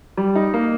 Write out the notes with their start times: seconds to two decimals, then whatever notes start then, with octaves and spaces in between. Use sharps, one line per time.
0.17 G3
0.36 D#4
0.54 A#3